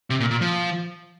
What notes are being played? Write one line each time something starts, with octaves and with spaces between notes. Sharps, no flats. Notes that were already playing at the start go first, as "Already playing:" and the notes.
C3
A#2
A#2
F3